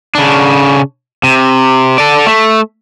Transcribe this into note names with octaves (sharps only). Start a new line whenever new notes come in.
C#3 D4
C3
A4 D5
A3